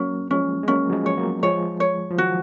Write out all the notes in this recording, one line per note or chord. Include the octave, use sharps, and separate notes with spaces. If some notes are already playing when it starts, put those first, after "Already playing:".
Already playing: F#3 A#3 C#4
F3 G#3 C#4
G#3
F#3 A#3 C#4
F#3
F3 G#3
C#5
B3
F#3 A#3
F3 G#3 C#5
C#5
F3
D#3 F#3 F#4